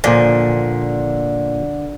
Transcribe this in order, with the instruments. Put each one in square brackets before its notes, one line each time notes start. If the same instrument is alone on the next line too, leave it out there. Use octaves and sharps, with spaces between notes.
[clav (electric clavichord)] A#2 F3 G#5 [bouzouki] D3